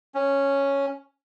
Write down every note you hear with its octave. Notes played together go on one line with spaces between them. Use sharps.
C#4